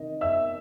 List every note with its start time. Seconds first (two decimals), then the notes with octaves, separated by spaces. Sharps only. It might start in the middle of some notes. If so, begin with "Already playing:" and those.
Already playing: C3 D#3 D#5
0.21 E5 E6